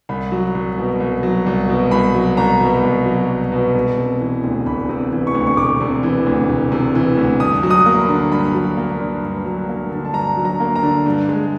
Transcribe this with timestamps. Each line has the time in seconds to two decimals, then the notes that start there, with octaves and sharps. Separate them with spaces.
0.09 C2 B5
0.32 F#3
0.55 C2
0.77 B2
1.00 C2
1.23 F#3
1.46 C2
1.69 B2
1.91 C2 B5
2.15 F#3
2.37 C2 A#5
2.60 B2
2.83 C2
3.06 F#3
3.29 C2
3.52 B2
3.74 E1
3.98 C3
4.21 E3
4.44 D2
4.66 E1 B5
4.89 C3
5.12 E3
5.27 C#6
5.34 D2
5.47 C#6
5.57 E1 D6
5.81 C3
6.03 E3
6.26 D2
6.49 E1
6.72 C3
6.95 E3
7.17 D2
7.40 G2 D#6
7.63 F#3
7.70 D#6
7.86 A#3
8.01 B5
8.09 D3
8.32 G2 B5
8.55 F#3
8.77 A#3
9.00 D3
9.23 G2
9.46 F#3
9.69 A#3
9.92 D3
10.05 A5
10.14 G2 A#5
10.37 F#3
10.45 A#5
10.60 A#3
10.75 A#5
10.83 D3
11.06 G2
11.29 G#3